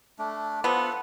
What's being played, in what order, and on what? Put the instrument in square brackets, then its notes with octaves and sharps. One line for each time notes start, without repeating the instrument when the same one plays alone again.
[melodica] A3 D4
[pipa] F3 B3 [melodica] A4 F#5